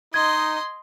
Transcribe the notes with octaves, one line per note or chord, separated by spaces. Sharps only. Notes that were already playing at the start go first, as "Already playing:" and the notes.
D#4 D#5 C6 G#6